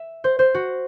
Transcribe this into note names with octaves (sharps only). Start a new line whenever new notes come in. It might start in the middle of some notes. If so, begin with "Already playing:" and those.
Already playing: E5
C5
C5
F#4